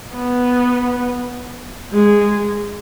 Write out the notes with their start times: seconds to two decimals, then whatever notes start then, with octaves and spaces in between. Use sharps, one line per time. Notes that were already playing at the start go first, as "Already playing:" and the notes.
0.15 B3
1.92 G#3